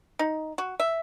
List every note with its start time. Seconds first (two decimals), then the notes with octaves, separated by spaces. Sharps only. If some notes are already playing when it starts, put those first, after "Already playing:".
0.19 D#4
0.58 F#4
0.80 E5